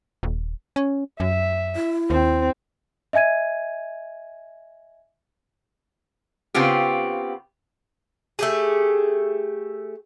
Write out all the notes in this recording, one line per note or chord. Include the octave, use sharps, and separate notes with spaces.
D#1
C#4
F#2 E5
E4
D#2 C4
D#5 E5 G#5 G#6 D#7
C#3 B3 C4 F4 G4
A3 G4 G#4